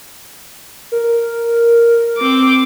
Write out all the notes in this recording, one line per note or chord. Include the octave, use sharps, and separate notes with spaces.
A#4
C4 D6